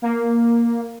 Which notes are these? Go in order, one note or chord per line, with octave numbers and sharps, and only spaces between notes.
A#3